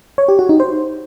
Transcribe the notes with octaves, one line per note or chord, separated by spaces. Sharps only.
C#5
G4
F#4
D#4
C5